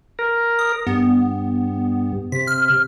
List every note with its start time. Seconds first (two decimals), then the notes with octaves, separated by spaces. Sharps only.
0.19 A#4
0.59 D#6
0.87 G2 B3
2.32 C3 B6
2.47 F6